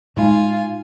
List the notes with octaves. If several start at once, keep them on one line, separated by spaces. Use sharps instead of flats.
A2 G#3 D#4 F4 F#4 G#5 B5